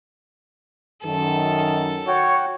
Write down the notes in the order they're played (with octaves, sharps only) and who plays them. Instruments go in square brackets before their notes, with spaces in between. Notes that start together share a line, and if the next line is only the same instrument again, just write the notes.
[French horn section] F#2 D#3 [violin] A4
[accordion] F#4 F#5 G5 [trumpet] C#5